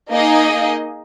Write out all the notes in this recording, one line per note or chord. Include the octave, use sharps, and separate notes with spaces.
A#3 D#4 G#4 D#5